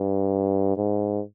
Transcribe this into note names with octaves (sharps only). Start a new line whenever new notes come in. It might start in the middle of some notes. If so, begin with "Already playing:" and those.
Already playing: G2
G#2